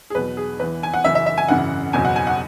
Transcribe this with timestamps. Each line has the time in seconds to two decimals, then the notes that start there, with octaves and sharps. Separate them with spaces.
0.10 G#4
0.15 E2 B2 F#3 B4
0.37 G#4
0.59 E2 E3 B4
0.83 G#5
0.94 F#5
1.04 F#1 F#2 E3 E5
1.15 E5
1.26 E5
1.38 G#5
1.48 G#1 F#2 C#3 E3 F#5
1.93 F#1 E2 B2 F#3 G#5
2.05 F#5
2.16 G#5
2.27 F#5